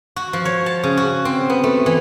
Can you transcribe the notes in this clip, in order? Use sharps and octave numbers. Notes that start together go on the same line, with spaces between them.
F#4
F3
C#5
A5
C#3
F#4
C4
B3
A3
E3